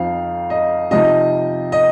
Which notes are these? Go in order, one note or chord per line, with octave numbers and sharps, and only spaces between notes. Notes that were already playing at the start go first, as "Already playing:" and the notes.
Already playing: F2 F3 C4 D#4 F5
D#5
C3 F3 D#4 D#5
D#5